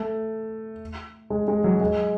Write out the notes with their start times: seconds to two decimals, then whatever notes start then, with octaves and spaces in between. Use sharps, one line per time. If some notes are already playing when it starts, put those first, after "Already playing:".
Already playing: A3
1.30 G#3
1.48 G#3
1.64 F#3
1.81 G#3